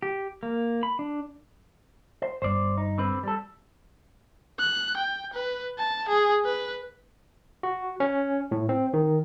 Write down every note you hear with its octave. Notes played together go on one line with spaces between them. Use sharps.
G4
A#3
B5
D4
C5
G1 G2 C5 D5
D#4
D3 C4 B4
G3 A4
F#6
G5
B4
A5
G#4
B4
F#4
C#4
A2
C4
D#3